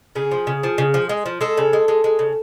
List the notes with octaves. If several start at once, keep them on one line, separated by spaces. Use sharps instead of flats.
C#3 G#4
F3
C#3
F3
C#3
F3
G#3
F3
G#3 A4
C#3
G#3
G#3
G#3
C#3